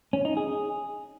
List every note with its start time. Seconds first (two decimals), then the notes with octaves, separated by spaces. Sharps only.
0.13 C#4
0.25 D#4
0.37 G#4